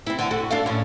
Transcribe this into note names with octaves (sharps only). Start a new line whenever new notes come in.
C4 E4
D3
F#4 A4
D4 A4 F5
A2 C#4